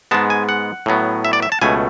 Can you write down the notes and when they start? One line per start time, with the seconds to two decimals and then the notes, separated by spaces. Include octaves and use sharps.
0.11 G#2 G#3 B3 A5
0.30 G#5
0.49 F#5
0.86 A2 F#3 B3
1.25 E5
1.33 D5
1.42 E5
1.52 A5
1.61 C#2 B2 A3 G#5